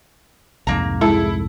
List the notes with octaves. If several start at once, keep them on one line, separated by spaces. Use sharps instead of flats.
C2 F2 G#2 A#3 A#5
G#3 E4 A4